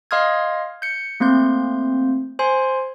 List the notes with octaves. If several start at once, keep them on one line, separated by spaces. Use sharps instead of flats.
D#5 F5 C6 D#6 F6 G#6
G6 C#7
A3 A#3 C4 C6 G6
C5 G#5 C6